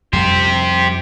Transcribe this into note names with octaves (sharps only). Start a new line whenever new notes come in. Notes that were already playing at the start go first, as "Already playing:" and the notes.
F2 G3 G4 C5